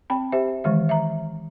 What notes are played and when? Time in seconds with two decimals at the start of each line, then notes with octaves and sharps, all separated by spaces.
0.10 C4 G5 B5
0.32 G4 C5 E5
0.64 D#3 E3 G#3 E5
0.89 E5 A#5